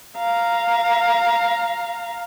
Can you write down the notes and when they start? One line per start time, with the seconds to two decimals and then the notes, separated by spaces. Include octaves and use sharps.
0.19 F5 A#5